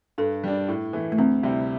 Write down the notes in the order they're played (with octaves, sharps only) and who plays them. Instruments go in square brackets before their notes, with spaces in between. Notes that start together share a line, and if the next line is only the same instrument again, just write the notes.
[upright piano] G2 [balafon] A4
[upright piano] G3 D4
A2
E3 A3
[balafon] A3
[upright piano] D2 [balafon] C4
[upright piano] C3 G3 E4